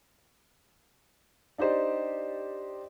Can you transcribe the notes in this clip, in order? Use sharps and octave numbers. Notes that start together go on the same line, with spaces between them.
D4 D#4 G4 C5 D5